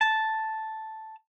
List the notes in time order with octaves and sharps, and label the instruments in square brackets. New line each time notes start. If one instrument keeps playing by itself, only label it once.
[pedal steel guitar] A5